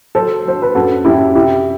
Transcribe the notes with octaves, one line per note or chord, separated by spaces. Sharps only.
F#3 A4 C5
F#3 C5
B4
F#2 F#4 A4
F#2 E4 G4
C3 E4 G4